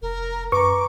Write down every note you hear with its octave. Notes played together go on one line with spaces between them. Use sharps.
F1 A#4
F#2 B4 A#5 C#6 D6